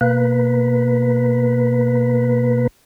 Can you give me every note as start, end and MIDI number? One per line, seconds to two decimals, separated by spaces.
0.01 2.67 47
0.01 2.67 58
0.01 2.67 71